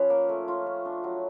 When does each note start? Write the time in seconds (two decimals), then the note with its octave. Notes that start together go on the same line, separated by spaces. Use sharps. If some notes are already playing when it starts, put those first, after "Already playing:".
Already playing: F3 C#4 B4 C#5
0.10 A#3
0.29 A3
0.48 F4
0.66 A3
0.85 D4
1.04 F#3